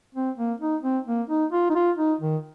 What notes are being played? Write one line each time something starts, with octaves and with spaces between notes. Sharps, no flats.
C4
A#3
D#4
C4
A#3
D#4
F4
D#4
F4
D#4
D#3